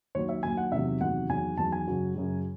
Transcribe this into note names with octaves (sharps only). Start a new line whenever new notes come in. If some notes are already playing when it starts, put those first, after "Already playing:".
D#2 D#3 F#3 C#5
E5
D#2 D#3 F#3 G#5
F#5
E2 C3 D#3 F#3 E5
E2 C3 D#3 F#3 F#5
E2 D#3 F#3 G#5
E2 D#3 F#3 A5
G#5
F#2 C#3 F#3
F#2 C#3 F#3